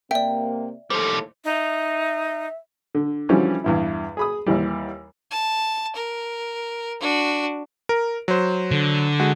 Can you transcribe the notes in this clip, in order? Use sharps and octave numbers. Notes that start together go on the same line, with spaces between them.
C3 A#3 D5 E5 G5
D#2 A2 F3 G3 A4 C5
D#4 E5
D3
D3 E3 F3 G3 C#4 F#4
E2 G2 E4
G#4 B5 D#6
D#2 E3 G3
A5
A#4
D4 F#4
A#4
F#3 C5
D3
G#3 F#4